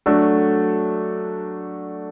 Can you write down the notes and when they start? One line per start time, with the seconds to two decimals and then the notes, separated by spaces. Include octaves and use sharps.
0.06 F#3 A3 D4 F#4 A4